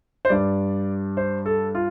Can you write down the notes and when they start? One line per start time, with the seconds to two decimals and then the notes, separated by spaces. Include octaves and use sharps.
0.25 C5
0.29 G2 G3 D5
1.17 C5
1.46 A4
1.75 F4